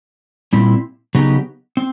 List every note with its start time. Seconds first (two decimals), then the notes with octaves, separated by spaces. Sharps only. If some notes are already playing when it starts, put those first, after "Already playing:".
0.53 A#2 G3 C4 E4
1.15 C#3 F#3 B3 D#4 G4
1.77 C4